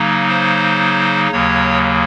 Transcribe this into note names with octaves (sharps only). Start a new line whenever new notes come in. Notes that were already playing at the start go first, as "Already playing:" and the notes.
Already playing: C#3 F#3 A#3 D#4
C5
D#2 C#3 F#3 A#3 C#5